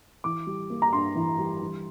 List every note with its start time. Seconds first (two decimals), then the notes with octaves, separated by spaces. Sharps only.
0.24 E3 D6
0.47 G3
0.70 A#3
0.82 A#5
0.93 G2 C6
1.15 E3
1.38 G3
1.61 E3